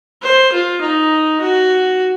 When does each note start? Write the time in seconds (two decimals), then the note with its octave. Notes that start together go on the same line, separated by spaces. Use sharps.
0.23 C5
0.53 F4
0.82 D#4
1.41 F#4